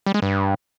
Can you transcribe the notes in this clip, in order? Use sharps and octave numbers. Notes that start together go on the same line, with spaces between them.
G3
G#3
G2